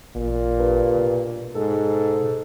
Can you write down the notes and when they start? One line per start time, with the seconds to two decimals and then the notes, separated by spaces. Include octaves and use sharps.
0.16 A1 A#2
0.59 G2
0.96 B2
1.55 G#2 A4